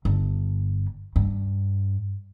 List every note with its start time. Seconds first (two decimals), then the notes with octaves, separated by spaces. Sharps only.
0.05 G1 D4
1.16 G2